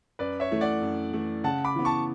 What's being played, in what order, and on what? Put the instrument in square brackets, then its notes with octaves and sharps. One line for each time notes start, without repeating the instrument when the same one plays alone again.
[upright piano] F#2 [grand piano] B4 D5
[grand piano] C#5 E5
[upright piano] E3 A3
[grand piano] D5 F#5
[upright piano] F#2
E3 A3
[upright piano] C#3 [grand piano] F#5 A5
[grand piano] B5 D6
[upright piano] E3 B3
[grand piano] A5 C#6